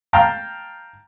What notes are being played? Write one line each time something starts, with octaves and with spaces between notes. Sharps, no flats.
F5 G5 A5 A#5